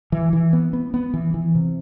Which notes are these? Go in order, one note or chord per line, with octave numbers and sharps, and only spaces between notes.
E3
E3
B3
B3
B3
E3
E3
C3